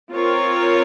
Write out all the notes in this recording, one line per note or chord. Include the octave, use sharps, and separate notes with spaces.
C4 F4 A#4 C#5